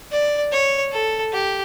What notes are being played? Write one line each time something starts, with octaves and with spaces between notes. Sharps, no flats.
D5
C#5
A4
G4